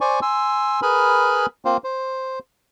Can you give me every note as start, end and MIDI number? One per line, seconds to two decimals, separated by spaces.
0.01 0.20 72
0.01 0.20 74
0.01 0.20 80
0.01 0.20 85
0.22 0.80 80
0.22 0.80 84
0.22 0.80 88
0.82 1.46 68
0.82 1.46 70
0.82 1.46 71
0.82 1.46 80
0.82 1.46 83
0.82 1.46 89
1.65 1.77 58
1.65 1.77 60
1.65 1.77 65
1.65 1.77 72
1.84 2.39 72